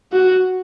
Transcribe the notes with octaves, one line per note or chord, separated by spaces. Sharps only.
F#4